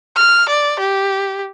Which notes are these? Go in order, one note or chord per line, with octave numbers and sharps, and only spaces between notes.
F6
D5
G4